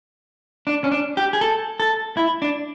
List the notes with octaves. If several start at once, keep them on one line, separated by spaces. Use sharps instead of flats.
D4
C#4
D4
G4
G#4
A4
A4
E4
D4